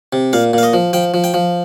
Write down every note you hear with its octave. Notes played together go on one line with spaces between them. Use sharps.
C3
A#2 F5
A#2 F5
D#5
F3
F3 G5
F3
G5
F3